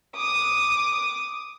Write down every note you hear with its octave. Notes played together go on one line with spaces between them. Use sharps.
D6 D#6